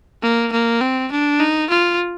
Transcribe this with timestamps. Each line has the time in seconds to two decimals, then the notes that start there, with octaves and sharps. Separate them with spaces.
0.22 A#3
0.52 A#3
0.81 C4
1.11 D4
1.40 D#4
1.70 F4